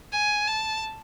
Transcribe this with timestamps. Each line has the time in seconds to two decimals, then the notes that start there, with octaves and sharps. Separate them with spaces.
0.12 G#5
0.47 A5